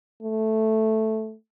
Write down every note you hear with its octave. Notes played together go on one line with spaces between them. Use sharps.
A3